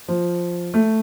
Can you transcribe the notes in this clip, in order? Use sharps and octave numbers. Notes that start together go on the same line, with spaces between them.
F3
A3